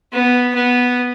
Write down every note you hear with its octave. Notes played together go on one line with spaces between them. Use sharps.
B3
B3